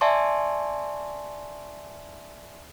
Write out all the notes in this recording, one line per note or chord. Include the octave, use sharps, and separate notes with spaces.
D5 E5 G#5 A5 C6 C#6